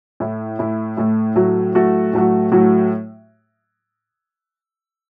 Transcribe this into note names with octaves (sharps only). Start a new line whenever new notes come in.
A2 A3 E4
A2 A3 E4
A2 A3 E4
A2 F#3 A3 F#4
A2 F#3 A3 F#4
A2 F#3 A3 F#4
A2 F#3 A3 F#4